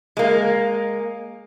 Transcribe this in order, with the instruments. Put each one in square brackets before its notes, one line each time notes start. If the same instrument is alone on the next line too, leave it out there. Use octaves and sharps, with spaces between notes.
[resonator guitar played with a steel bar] G#3 A#3